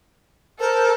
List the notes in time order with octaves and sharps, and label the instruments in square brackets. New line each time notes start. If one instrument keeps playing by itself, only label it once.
[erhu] A4 [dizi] A#4 [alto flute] C5